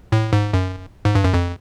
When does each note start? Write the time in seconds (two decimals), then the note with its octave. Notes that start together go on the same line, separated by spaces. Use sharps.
0.12 A2
0.33 G#2
0.53 F#2
1.05 G#2
1.15 G2
1.24 F#2
1.34 F2